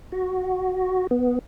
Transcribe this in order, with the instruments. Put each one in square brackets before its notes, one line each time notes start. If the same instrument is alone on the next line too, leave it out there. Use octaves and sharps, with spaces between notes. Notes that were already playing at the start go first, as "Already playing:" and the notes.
[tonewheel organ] F#4
B3